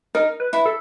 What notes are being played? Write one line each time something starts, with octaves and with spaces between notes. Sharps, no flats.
D#4 A#4
B4
E4
A4